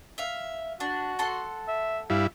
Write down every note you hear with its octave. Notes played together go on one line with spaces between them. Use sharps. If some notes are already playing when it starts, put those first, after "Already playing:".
E5 F5
D4 F#4
A4 F#5 C6
E5
G2 E4 F5